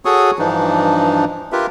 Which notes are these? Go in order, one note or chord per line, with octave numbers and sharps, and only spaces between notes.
F#4 G#4 A4 C#5 C#6 D#6
G2 E3 F3 D4 D#4
F4 G4 A#4 B4 E5